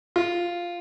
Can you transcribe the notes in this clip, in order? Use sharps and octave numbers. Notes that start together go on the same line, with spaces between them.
F4